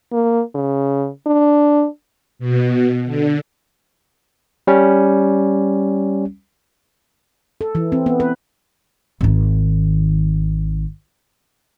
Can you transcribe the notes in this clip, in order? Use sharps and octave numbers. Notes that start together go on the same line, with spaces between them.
A#3
C#3
D4
B2
D3
G3 C#4
A4
E3
C4
B3
B4
G#1 D#3